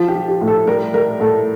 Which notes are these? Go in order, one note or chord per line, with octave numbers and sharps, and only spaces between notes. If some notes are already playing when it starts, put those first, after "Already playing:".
Already playing: F3 F4
G4
F3
G4
A2
A4
G3 A#4
G3 A#4
A2 A4